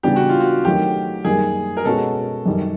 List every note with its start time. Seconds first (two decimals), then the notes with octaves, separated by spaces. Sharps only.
0.03 C#3 E3 G3 B3 D4 G4
0.16 F#4
0.29 F4
0.40 F#4
0.64 D#3 F#3 A3 C4 G4
1.24 F#2 D#3 G3 A#3 G#4
1.77 A#4
1.85 B2 G#3 C#4 F#4 A4
2.46 F#2 D#3 G3